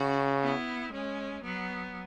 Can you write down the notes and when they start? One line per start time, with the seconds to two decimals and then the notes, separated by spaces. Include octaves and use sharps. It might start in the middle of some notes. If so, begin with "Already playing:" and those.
Already playing: C#3 C#4 F#4
0.43 B3 E4
0.93 G#3 C#4
1.44 F#3 B3